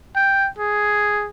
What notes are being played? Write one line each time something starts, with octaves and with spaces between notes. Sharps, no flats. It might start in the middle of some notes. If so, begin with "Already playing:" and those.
G5
G#4